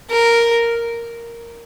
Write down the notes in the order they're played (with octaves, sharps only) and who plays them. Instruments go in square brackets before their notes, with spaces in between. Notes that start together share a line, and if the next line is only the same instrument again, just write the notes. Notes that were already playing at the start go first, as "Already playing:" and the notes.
[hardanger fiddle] A#4